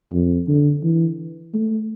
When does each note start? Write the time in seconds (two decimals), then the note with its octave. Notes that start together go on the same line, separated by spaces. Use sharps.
0.13 F2
0.48 D3
0.83 E3
1.54 A3